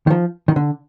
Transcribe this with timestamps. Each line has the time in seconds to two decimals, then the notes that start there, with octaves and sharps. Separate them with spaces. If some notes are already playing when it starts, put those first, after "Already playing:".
0.07 D#3
0.10 F3
0.48 D#3
0.56 D3